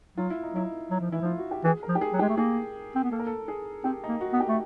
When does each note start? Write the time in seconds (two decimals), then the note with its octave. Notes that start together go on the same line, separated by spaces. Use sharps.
0.18 F#3 F4
0.30 E4
0.43 D#4
0.54 F#3 E4
0.91 F#3
1.01 F3
1.11 E3 E4
1.22 F3 F4
1.38 F#4
1.51 G4
1.64 E3 G#4
1.83 A#4
1.89 F3
1.95 G4
2.01 G#4
2.13 F#3
2.19 G#3 G4
2.29 A3
2.37 A#3 G#4
2.95 C4
3.04 B3
3.11 A#3 A4
3.19 A#4
3.27 A4
3.48 G#4
3.84 C4 G4
4.04 D#4
4.09 A#3
4.21 F#4
4.33 B3
4.40 G4
4.49 A3